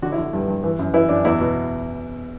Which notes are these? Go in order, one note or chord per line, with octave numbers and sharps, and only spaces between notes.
D3 F#4
E4
D3
G2
G2
E3
F#2
E3 E4
F#2 D4
E2 E4
B2